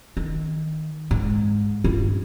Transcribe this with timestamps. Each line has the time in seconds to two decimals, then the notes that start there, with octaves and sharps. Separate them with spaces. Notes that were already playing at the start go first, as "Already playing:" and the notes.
0.17 D#3
1.11 G#2
1.84 G2 F4